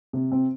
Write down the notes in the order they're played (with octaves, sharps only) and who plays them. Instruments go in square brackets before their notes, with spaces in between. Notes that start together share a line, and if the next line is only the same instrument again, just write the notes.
[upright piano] C3
C4